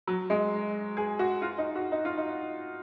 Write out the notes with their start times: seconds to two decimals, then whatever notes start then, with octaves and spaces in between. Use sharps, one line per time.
0.07 F#3
0.30 G#3
0.97 G#4
1.19 F#4
1.42 F4
1.58 D#4
1.76 F#4
1.92 D#4
2.05 F4
2.18 D#4